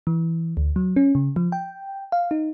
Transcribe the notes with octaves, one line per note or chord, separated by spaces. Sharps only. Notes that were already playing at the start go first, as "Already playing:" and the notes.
E3
D2
F#3
C#4
C#3
F3
G5
F5
D#4